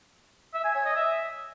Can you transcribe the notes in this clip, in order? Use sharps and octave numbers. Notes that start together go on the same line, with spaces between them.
E5
G#5
C#5
D#5
E5